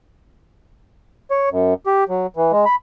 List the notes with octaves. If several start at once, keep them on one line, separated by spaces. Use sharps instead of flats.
C#5
F#2
G4
F#3
E3
G#3
B5